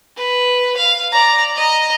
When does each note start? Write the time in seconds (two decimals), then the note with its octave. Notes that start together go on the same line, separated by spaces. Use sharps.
0.17 B4
0.77 F5
1.12 D5 A#5
1.56 D#5 A#5